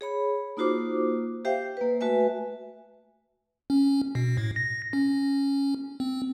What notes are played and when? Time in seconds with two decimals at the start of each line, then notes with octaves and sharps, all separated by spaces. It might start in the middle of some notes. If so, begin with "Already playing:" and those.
0.01 G#4 C#5 B5
0.57 A#3 D#4 F4 F#4 C5 D6
1.45 G4 C5 E5 F5 G5
1.77 A#3 B4
2.01 A3 F#4 B4 E5 G#5
3.70 C#4
4.15 B2
4.37 A2
4.56 A#6
4.93 C#4
6.00 C4